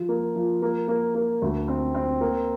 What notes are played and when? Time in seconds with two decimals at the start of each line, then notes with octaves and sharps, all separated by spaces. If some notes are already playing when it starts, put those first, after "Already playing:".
Already playing: F3
0.09 A#3
0.35 F3
0.62 A#3
0.88 A#3
1.15 A#3
1.42 D2
1.68 C4
1.95 C4
2.21 A#3